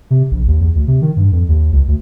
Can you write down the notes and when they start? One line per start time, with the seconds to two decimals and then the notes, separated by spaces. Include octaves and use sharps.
0.11 C3
0.31 A#1
0.47 D#2
0.61 E2
0.75 D2
0.88 C3
1.02 D#3
1.17 G2
1.32 F2
1.48 D#2
1.72 C#2
1.88 D2